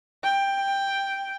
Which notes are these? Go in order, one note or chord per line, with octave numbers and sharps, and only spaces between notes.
G5